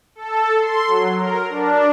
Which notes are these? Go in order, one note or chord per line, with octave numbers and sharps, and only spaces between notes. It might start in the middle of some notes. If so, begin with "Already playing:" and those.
A4
C6
F#3
A#4
D4